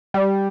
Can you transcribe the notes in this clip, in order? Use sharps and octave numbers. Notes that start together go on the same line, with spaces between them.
G3